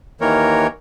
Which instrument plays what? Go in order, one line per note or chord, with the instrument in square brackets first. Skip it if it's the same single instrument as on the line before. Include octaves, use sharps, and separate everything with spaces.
[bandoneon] D#2 D#3 E3 A#3 A#4 C#5